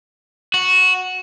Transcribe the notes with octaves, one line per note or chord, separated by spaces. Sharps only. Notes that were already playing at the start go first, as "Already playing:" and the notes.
F#4